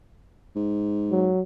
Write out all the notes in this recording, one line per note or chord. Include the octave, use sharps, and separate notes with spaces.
G#2
F#3